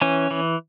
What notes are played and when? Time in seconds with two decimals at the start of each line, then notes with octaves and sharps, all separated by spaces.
0.01 E3 C#4
0.31 E3